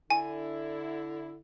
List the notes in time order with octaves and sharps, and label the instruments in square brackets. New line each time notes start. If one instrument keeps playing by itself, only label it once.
[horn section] D3 E4 [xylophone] G#5